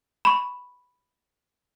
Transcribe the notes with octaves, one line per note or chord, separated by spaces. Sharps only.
B5 C#6